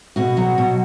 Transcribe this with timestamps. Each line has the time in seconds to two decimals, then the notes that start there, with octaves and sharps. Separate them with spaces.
0.16 B2 F#4
0.37 F#3
0.58 B2